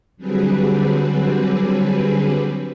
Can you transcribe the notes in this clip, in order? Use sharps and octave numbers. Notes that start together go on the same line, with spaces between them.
D3 F#3 G3 C4 G#4 B4